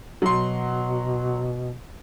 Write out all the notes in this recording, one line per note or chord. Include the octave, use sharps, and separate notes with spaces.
B2 F#3 C6